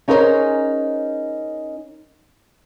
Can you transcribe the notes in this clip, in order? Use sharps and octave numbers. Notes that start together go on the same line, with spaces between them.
C#4 D#4 G#4 A#4 C5 C#5